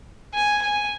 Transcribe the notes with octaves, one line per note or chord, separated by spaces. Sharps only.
G#5
G#5